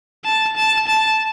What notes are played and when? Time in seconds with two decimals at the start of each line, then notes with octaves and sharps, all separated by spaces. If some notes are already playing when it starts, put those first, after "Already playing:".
0.25 A5
0.56 A5
0.87 A5